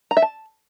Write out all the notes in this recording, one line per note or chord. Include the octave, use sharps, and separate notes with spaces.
A#5
E5
A5